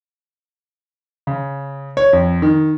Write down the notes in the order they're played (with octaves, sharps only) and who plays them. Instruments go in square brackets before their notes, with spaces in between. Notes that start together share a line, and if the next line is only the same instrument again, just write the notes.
[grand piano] C#3
C#5
F2
D#3